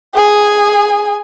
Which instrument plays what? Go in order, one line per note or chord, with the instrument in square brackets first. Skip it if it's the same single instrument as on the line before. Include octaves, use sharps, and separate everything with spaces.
[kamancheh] G#4 G#5